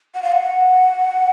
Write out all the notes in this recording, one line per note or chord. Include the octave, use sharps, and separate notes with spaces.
F#5
F5
F#5